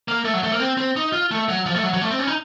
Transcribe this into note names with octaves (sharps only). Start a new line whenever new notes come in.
A#3
A3
F#3
A3
A#3
C4
C4
D#4
F4
A3
F#3
F3
A3
F#3
F#3
A3
C4
C#4
D#4